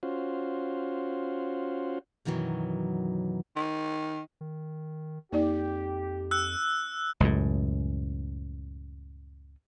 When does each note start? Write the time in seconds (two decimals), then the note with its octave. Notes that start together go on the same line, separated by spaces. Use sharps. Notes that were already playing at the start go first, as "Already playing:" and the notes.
0.03 C#4 F4 F#4 C5
2.25 F#2 B2 D#3 E3 F#3
3.56 D#3
4.41 D#3
5.32 F2 A#3 D#4 G4 D5
6.31 E6 F#6
7.20 C#2 F#2 A2